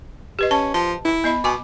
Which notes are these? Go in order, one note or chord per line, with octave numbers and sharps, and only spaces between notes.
G4 B4 D#5
C#4 A5
F3 A5
E4
B3 D#5 B5
B2 G#5 D6